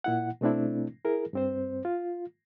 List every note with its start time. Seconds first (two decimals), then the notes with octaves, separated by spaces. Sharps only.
0.04 A#2 E4 F#5
0.41 B2 A3 C4 D4 E4
1.05 E4 G#4 A#4
1.33 G2 C4 C5
1.85 F4